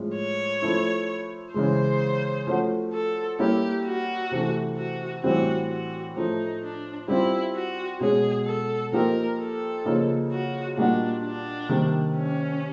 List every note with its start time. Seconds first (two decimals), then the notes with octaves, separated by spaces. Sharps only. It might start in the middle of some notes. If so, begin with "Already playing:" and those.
Already playing: A2 F3 G#3 C#4
0.16 C#5
0.62 F3 A3 C#4 E4
1.54 C#3 E3 G#3 C5
2.47 F3 A3 C#4 F#4
2.93 A4
3.39 G3 A#3 C#4 E4 G4
3.85 F#4
4.31 C3 E3 A3
4.77 F#4
5.24 A2 E3 G3 C4 F#4
5.69 F#4
6.16 A2 F3 A3 D#4
6.62 D4
7.08 G3 C4 E4 F4
7.55 F#4
8.01 B2 G#3 C#4 G#4
8.46 A4
8.92 F3 A#3 D#4 G4 A#4
9.39 A4
9.85 C#3 F3 A#3 D#4
10.31 F#4
10.77 A#2 G3 A#3 D4 D#4 F#4
11.24 D4
11.69 C3 D#3 G3 A#3
12.16 C#4